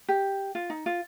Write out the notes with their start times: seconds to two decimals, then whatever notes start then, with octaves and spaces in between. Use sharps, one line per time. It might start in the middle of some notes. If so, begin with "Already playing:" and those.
0.09 G4
0.55 F4
0.70 D#4
0.86 F4